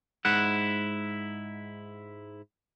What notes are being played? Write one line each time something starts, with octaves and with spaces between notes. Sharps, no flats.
G#2 E4 F#5